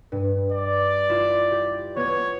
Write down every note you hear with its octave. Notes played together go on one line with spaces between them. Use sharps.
G2
D5
E4 F4
G4
B3 C#5 G#6